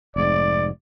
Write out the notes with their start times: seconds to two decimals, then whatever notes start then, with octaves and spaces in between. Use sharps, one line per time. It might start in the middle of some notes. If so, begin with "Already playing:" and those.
0.16 F1 G#2 D5